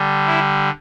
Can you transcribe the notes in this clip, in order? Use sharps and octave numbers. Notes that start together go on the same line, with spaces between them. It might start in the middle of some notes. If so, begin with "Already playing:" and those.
Already playing: D3 G3
E4